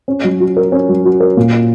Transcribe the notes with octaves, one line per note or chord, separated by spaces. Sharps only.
C#4
F#3
F#4
A#4
C#4
F#3
F#4
A#4
A#2